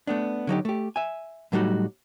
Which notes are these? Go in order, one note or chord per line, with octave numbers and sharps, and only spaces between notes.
A3 B3 D4
D3 F#3 D#4 G4
A3 G4
E5 G#5
A2 F#3 G3 A3 D#4 F#4